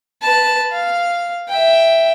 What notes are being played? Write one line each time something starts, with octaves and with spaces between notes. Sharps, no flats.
B4 A5
F5
E5 G5